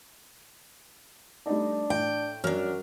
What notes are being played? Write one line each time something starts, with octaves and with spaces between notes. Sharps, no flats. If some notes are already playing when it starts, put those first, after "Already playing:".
G3 A3 D4 D#4
A2 G5
F#2 F#3 D4 F6